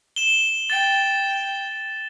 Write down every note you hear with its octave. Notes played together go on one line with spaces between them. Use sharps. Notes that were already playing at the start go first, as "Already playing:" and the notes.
E7 G7
G5 A6